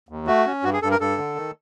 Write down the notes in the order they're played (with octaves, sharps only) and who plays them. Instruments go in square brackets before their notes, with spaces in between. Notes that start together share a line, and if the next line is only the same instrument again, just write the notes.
[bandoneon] D#2
A3 F#4
C#4
G2 F#4
G#4
G2 A4
A#4
G2 A4
D3
D#3